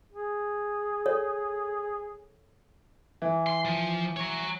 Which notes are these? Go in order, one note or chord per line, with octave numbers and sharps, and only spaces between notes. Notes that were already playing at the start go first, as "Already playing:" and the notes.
G#4
A4 C#5
E3
C6
F3
C#5 A#5